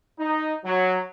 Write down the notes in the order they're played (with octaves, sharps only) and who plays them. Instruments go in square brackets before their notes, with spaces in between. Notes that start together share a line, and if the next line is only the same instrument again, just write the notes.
[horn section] D#4
F#3